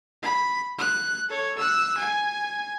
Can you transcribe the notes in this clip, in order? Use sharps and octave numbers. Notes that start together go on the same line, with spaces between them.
B5
F#6
A4 C#5
E6 F#6
G#5